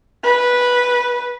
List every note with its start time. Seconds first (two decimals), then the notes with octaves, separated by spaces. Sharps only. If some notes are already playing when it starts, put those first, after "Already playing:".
0.24 B4